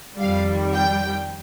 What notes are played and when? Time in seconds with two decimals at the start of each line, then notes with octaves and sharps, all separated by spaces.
0.18 F2 D#3 G3 F5
0.76 G5